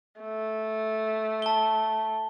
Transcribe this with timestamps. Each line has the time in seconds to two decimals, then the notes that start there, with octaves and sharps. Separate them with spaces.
0.20 A3
1.42 A5 G7